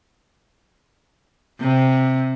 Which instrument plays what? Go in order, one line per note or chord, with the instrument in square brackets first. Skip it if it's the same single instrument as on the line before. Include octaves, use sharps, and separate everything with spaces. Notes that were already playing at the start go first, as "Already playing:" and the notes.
[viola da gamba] C3